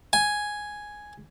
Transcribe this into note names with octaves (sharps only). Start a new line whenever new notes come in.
G#5